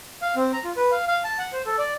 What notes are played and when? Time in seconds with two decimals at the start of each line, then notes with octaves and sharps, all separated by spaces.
0.22 F5
0.36 C4
0.53 A#5
0.64 F4
0.77 B4
0.91 F5
1.08 F5
1.24 A5
1.39 F#5
1.53 C5
1.66 A4
1.78 D5